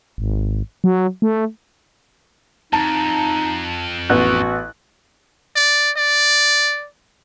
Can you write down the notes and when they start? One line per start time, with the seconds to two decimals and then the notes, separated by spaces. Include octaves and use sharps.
0.18 G#1
0.84 F#3
1.22 A3
2.73 F2 D#4 A5
4.10 A1 B3 F#4 F#6
5.56 D5
5.97 D5